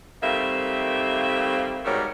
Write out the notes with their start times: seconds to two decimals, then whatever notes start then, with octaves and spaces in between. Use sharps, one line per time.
0.22 D#3 G3 A3 A#3 C4 E5
1.85 G#2 B2 G3 A3 A#4 C#5